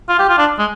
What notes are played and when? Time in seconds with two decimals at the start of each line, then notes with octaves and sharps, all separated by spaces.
0.08 F4
0.19 G4
0.29 F4
0.38 D4
0.58 G#3